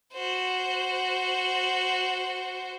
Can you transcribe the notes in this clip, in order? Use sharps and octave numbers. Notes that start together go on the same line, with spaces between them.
F#4 C5